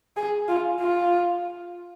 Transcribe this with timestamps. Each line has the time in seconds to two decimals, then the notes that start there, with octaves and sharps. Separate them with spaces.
0.17 G#4
0.48 F4
0.81 F4